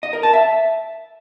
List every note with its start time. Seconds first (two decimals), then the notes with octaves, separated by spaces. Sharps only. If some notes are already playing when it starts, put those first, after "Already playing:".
0.03 D#5
0.13 A#4
0.23 A5
0.33 E5